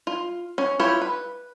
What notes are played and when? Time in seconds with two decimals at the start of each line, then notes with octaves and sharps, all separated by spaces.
0.07 F4
0.58 C#4
0.80 E4 F4 G4 C#5
1.02 B4